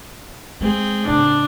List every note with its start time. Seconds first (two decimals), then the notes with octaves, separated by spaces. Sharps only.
0.61 G#3 C4 G#4
1.06 A2 C#3 D4